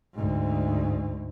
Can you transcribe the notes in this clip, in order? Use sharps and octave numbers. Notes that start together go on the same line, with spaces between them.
D2 G#2